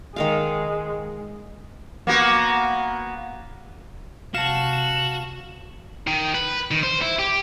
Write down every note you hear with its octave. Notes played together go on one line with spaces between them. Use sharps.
D#3 G#3 A#4 F5
A#3 B3 F#4
C3 F#4 F5 A5 E7
D#3
B4
D#3
C5
E4
G4